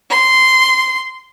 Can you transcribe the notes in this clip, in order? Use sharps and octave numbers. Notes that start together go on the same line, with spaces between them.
C6